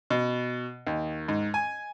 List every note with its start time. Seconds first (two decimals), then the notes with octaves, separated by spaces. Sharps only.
0.10 B2
0.87 D#2
1.28 G#2
1.54 G#5